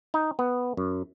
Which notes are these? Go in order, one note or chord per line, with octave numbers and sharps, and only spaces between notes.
D#4
B3
F#2